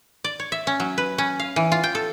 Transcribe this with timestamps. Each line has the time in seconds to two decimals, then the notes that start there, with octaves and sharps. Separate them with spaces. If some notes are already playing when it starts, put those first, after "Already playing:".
0.24 D5
0.40 C#5
0.52 E5
0.67 C#4
0.80 F#3
0.98 B4
1.18 C#4
1.40 F5
1.56 E3
1.72 F4
1.84 G5
1.95 A4